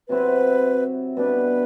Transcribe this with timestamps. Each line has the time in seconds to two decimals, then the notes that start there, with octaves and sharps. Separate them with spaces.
0.08 C3 F#3 C4 E4 B4
1.16 B2 G3 D4 B4